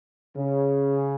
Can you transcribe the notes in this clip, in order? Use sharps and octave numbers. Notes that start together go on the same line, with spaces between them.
C#3